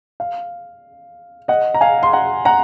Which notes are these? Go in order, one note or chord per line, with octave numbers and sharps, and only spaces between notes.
F5
D#5 F#5
A#5
F5 G#5
C6
F#5 A#5
F#5 A#5